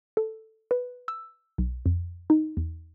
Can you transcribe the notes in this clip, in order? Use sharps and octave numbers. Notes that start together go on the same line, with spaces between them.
A4
B4
E6
B1
F2
D#4
E2